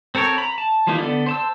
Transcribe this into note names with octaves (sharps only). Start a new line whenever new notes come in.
C4 A4 A#4 C#5
A#5 B5
A5
E3 F3 G3 A#3 D#4
D3 B3 A4 D5 B5
C5 A5 E6